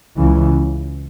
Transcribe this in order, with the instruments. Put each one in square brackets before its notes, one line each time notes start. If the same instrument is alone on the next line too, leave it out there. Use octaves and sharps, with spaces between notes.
[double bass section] C#2 C#3 E3